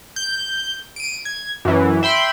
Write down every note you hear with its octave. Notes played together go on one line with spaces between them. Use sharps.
G6
D7 D#7
G#6
F#2 E3
E5 G5 B5 C6